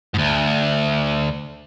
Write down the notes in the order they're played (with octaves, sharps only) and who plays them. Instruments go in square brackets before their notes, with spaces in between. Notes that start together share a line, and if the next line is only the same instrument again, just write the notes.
[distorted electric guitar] D2 G#2